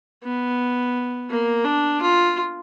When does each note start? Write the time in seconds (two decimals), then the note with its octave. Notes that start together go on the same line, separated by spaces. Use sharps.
0.23 B3
1.30 A#3
1.65 D4
2.01 F4